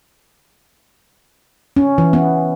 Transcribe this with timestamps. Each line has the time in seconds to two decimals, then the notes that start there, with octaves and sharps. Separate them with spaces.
1.76 C#4
1.98 E3
2.13 B3